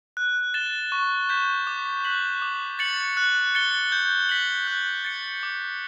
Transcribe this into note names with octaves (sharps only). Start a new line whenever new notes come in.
F#6
A6 E7 G7
C#6
G6 B6 E7
D6
F#6 B6 F#7
D6
A6 C#7 F#7
F#6
A6 C#7 G7
G6
B6 F#7
F#6
A6 C#7
D6